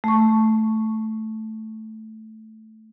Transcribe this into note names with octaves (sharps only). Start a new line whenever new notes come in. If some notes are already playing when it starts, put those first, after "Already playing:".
A3 C#6